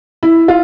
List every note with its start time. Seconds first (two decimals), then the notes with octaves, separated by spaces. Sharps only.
0.23 E4
0.48 F4